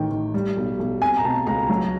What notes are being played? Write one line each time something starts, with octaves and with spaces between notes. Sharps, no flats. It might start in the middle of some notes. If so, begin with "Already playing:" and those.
Already playing: A1 D#3 G5
D#3
G3
B1
B1
C4 G#5
A#5
B2 A5
C#2 A#5
F#3